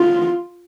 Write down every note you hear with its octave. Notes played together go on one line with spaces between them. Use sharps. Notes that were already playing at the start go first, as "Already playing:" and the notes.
Already playing: F4